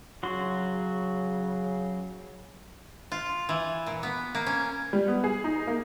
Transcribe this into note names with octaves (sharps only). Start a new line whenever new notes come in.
C#3 F#3 F#4 C6
F4
E3
A#2
B3
A#3
C#4
G3
B3
G#4
D#4
A#3